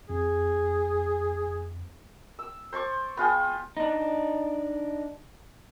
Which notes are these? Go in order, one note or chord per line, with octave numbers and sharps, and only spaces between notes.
F2 G#4
E6
C5 A5 C#6 D6
B3 F4 G#4 G5
D4 D#4